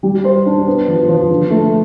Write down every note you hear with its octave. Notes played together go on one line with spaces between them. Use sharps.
G3
C5
D4
B3
F3
F3
D3
A3